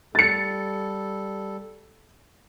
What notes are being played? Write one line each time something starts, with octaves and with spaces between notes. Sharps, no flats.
G3 A4 A6 C#7